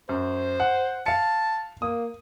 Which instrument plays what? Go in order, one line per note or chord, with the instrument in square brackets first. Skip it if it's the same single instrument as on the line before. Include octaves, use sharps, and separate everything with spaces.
[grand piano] F#2 [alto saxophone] C5
[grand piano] F#5
[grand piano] F5 C#7 [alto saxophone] A5
[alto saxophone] A#3 [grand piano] D#6